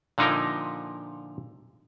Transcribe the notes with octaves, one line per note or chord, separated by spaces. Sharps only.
A#2 D3 F3 D#4 E4 A#4